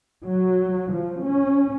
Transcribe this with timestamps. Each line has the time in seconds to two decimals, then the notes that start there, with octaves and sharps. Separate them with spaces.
0.24 F#3
0.91 F3
1.23 C#4